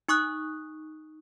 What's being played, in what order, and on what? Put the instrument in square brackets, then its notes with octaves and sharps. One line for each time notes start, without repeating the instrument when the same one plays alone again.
[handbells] D#4 C#6 D#6 F#6